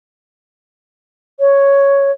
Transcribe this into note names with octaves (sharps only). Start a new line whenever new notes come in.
C#5